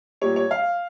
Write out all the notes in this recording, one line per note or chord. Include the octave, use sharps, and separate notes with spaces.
A#2 G3 C#5
C#5
F5